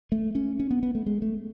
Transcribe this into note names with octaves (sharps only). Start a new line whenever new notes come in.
A3
C#4
C#4
B3
B3
A3
G#3
A3